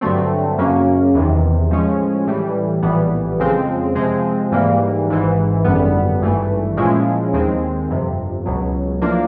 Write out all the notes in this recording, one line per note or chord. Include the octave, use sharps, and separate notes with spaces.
G2 D3 F#3 A3 C4
F#2 C#3 F#3 A#3 C#4
E2 C3 D#3
A2 F3 G#3 C#4
A2 E3 G3
A#1 A2 E3 G3 B3
F2 C#3 F3 G#3 C4
C3 F3 G#3 C4
G#2 E3 G3 A#3
G#1 G#2 E3
G#1 F#2 D3 G3 B3
G#1 G2 E3 A3
A#2 F3 G#3 C#4 E4
D#2 D#3 G#3 C4
G1 F2 C3
C#2 B2 F#3
A2 F3 A#3 D4